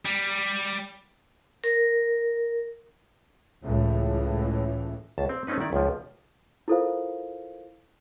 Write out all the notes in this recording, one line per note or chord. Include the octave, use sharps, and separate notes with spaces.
G3
A#4
C#2 A2 E3
C#2 A5
C4
A3 C4 C#4 D#4 B4
D#3 E4 D5
C#2 F3
E4 F4 A4 A#4 C5 F5